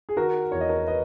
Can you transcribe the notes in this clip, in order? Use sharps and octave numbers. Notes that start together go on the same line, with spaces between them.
G#4
D#3 F#4 A#4
E2 C#5
D#5
A#4 C#5
B4 D#5